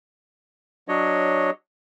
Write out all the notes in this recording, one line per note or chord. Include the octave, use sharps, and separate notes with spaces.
F#3 D4 C#5 D#5